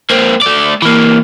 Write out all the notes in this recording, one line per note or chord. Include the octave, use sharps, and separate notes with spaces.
A#3 C4
A3 D5
E3 A#3